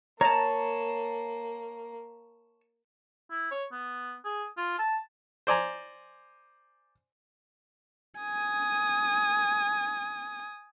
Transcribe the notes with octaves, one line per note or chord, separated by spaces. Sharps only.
A#3 C#5 A5 A#5
E4
C#5
B3
G#4
F4
A5
C5 D5 G#5 A#5
G#5 D#6